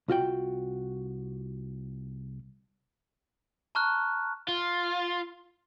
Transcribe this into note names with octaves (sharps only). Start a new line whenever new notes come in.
C2 F4 F#4 G5
A5 A#5 C#6 F6 F#6
F4